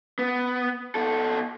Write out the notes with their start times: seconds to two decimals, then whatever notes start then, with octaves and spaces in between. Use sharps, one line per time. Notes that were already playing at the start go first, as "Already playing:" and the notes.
0.19 B3
0.95 B2 A4